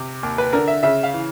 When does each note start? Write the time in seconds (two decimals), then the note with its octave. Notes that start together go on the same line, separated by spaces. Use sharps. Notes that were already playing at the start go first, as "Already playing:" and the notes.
Already playing: C3
0.23 D#2
0.38 B4
0.53 D3 A#4
0.68 E5
0.83 C#3 E5
1.03 F5
1.14 E3